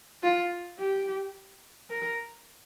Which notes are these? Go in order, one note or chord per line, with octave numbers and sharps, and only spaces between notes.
F4
G4
A#4